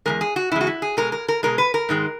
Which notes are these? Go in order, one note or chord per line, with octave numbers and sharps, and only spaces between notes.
E2 D#3 G#3 A#4
G#4
F#4
E2 C#3 G#3 E4
F#4
E4
G#4
B2 G#3 A#4
A#4
A#4
B2 G#3 A#4
B4
A#4
G#2 D#3 G#3